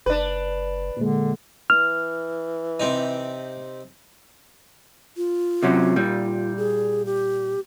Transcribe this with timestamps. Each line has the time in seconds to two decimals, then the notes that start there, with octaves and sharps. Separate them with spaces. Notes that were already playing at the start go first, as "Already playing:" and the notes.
0.06 F#1 D4 B4
0.97 A#2 D3 G#3
1.70 E3 F6
2.80 C3 C4 D#4
5.17 F4
5.63 C3 F#3 C#4
5.96 A#2 G3
6.57 G#4
7.06 G4